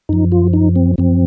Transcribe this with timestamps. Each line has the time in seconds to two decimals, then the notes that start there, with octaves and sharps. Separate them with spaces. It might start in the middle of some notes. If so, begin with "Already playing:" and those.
0.09 F#2 F3 D#4
0.32 F4
0.53 D#4
0.76 C4
0.98 F#2 F3 C4